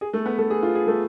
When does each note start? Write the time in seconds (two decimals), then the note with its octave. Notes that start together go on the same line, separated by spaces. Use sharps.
0.01 G#4
0.13 A3 A4
0.25 B3 B4
0.38 A3 A4
0.50 G#4
0.63 F4
0.75 G#4
0.87 A3 A4